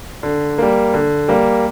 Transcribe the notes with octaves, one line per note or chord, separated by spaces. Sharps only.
D3
G3 A#3
D3
G3 A#3